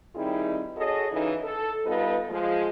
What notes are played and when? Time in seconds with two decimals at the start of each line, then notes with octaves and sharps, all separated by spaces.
0.15 D#3 G3 C4 D#4 E4 G#4
0.77 F#4 G#4 A4 C#5 D#5
1.12 C#3 E3 D#4
1.43 A4
1.85 G3 B3 D#4 F4 A4 B4
2.30 F3 G#3